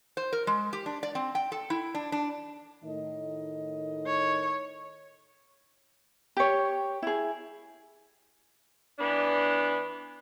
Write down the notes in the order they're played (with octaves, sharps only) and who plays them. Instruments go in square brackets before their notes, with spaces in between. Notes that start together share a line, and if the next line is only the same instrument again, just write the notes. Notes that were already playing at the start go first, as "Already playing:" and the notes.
[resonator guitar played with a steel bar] C5
A#4
G#3
G4
D4
D5
C4
G5
A4
E4
D4
D4
[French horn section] A2 D#3 D#5
[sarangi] C#5
[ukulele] G4 C#5
E4 G#4
[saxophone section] E3 B3 D4